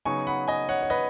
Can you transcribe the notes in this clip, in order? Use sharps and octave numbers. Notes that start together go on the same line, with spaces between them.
C#3 F#3 B3 D#4 G#5 C#6
F#5 B5
D#5 G#5
C#5 F#5
C#5
B4 D#5